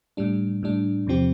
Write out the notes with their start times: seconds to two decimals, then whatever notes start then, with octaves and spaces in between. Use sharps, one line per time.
0.17 A2 G3 D4
0.63 A2 G3 D4
1.07 E2 C3 F3 C4 G4